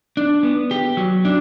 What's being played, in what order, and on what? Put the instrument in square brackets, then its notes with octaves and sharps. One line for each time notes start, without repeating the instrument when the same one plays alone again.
[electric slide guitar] D4
B3
G4
F#3
D4